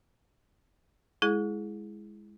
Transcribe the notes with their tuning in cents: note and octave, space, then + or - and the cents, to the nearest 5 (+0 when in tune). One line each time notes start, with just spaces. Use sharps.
G#3 +0 E4 +5 G#4 +20